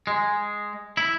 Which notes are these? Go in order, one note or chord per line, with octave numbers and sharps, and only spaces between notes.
G#3
E4